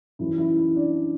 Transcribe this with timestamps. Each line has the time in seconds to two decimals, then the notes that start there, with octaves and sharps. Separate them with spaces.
0.19 F#2 E3 G3 E4
0.38 E4
0.58 E4
0.76 D4